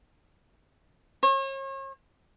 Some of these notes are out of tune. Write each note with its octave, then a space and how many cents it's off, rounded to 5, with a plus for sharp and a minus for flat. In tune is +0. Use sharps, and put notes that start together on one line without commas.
C#5 -40